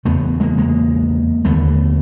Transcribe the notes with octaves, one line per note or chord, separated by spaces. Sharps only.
E2 C#3 A3 B3
G#3 A#3
G#3 A#3
D#2 D3 A3 B3